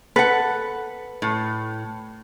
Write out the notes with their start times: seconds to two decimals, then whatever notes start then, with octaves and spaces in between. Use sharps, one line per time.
0.16 A4 B4 F#5
1.22 A2